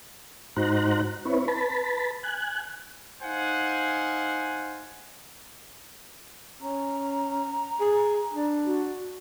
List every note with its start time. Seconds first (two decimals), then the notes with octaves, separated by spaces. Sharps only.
0.56 G#2 D#4 F#4 C5 A#5 F#6
1.25 C4 E4 B4 C#5
1.48 B4 A5 B5
2.23 G#5 F#6
3.22 D#4 C5 F5 F#5 G#5
6.62 C#4 A#5
7.80 G#4
8.34 D4
8.66 F#4